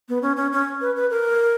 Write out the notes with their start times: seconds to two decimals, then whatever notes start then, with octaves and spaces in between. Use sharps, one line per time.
0.09 B3
0.22 C#4
0.37 C#4
0.52 C#4
0.81 B4
0.96 B4
1.10 A#4